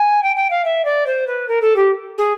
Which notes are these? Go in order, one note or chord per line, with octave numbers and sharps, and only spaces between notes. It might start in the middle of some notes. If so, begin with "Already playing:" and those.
Already playing: G#5
G5
G5
F5
E5
D5
C5
B4
A#4
A4
G4
G#4